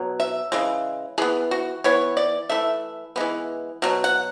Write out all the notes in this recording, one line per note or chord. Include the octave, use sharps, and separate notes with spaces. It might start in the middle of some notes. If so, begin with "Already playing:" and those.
Already playing: B2 F#3
E5
C#3 E3 G#3
E3 B3 G#4
F#4
E3 B3 C#5
D5
E3 A3 E5
E3 G#3 B3
B2 F#3
F#5